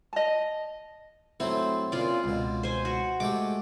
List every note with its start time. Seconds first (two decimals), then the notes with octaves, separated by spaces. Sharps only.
0.13 D#5 A5
1.40 F#3 A3 C4 E4
1.92 A#2 C#3 F4 D5
2.24 C#2 B2
2.63 C5 G#5
2.85 F#4
3.20 G#3 A3 G4 D6